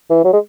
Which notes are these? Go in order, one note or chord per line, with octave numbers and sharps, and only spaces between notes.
E3
F#3
G#3